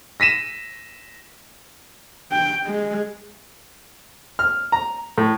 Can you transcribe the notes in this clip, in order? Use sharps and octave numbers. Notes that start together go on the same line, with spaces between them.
A#6 B6 D#7 E7
G5
G#3
F6
A#5
A2